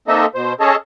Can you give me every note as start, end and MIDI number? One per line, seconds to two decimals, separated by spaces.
0.08 0.26 58
0.08 0.26 60
0.08 0.26 63
0.08 0.26 69
0.08 0.26 75
0.08 0.26 76
0.35 0.53 47
0.35 0.53 72
0.60 0.75 61
0.60 0.75 68
0.60 0.75 69
0.60 0.75 73
0.60 0.75 75
0.60 0.75 81